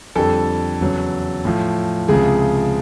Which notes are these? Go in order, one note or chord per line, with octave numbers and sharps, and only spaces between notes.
F2 D3 G3 A4
E2 C#3 F#3
A2 F3
C#2 C3 F3 G#4